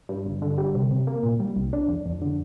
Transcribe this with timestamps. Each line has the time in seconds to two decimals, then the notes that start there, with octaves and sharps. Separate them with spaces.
0.09 G2
0.25 G1
0.42 D3
0.58 G3
0.75 C3
0.91 C3
1.07 A#3
1.23 A#2
1.40 G3
1.56 C2
1.73 D4
1.89 F2
2.06 F2
2.21 D3